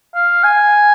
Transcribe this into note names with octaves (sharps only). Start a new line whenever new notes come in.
F5
G#5